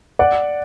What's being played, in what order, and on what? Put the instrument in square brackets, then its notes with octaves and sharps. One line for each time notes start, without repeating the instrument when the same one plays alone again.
[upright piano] D5 F#5